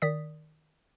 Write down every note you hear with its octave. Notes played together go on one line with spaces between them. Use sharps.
D#3 D5 D#6 B6